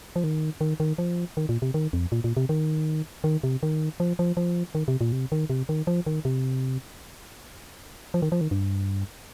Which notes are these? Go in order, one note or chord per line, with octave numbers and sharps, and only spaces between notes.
F3
D#3
D#3
D#3
F3
D#3
A#2
C3
D#3
F2
A#2
A#2
C3
D#3
D#3
C3
D#3
F3
F3
F3
D#3
C3
A#2
C3
D#3
C3
D#3
F3
D#3
C3
F3
D#3
F3
D#3
G2